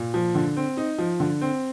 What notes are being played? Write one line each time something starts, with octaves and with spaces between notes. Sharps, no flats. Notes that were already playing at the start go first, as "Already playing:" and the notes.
Already playing: A#2
F3
D3
C4
D#4
F3
D3
C4